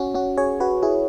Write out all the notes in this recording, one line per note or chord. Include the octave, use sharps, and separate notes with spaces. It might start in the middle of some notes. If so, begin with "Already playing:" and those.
Already playing: C#4 F#4
C#4 F#4
G#4 C#5
F#4 B4
E4 G#4